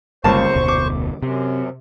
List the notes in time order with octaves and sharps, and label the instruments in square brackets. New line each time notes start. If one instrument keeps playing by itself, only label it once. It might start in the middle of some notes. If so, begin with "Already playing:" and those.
[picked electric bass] G1 G3 G#3 [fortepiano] C#2 A#3 A5 [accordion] C5 C#6
[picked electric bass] F1 D2 B2
[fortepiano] D6
[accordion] F#2 [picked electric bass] C3